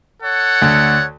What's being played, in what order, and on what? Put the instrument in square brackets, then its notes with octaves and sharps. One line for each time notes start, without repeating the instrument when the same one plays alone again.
[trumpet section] A4 C#5 F#5
[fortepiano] D2